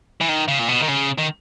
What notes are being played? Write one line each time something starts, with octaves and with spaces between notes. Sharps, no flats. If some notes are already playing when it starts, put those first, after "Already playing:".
E3
D#3
C#3
A#2
B2
D#3
C#3
D#3